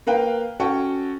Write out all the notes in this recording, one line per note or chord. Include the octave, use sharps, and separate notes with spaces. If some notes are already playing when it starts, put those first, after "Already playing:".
A#3 A#4 B4 F5 G5
C#4 F#4 A4 G5 A5 C#6